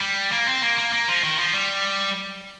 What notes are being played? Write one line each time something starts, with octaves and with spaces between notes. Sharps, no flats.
G3
A#3
C4
A#3
A#3
A#3
F3
D#3
F3
G3